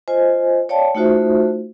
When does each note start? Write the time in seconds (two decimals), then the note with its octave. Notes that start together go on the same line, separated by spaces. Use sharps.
0.08 F4 C5 D#5 G#5
0.69 C#5 D5 F5 G5 A5
0.95 A3 D#4 F4 F#4 C5 E5